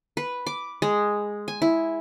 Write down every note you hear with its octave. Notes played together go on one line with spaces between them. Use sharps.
B4
D6
G#3
G#5
E4